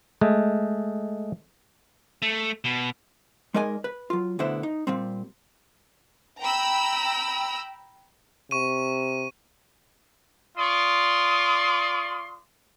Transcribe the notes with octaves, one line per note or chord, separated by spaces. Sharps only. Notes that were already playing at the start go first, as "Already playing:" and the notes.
G#3 A3
A3
B2
G#3 D#4 A#4 D5 D#5 G#5
B4
F#3 F4
D2 B2 D3 B3 E4 C5
D#4
A#2 G3 C4
G5 A#5 B5 E6
C3 C#6 D#7
F4 D5 C6 C#6 D#6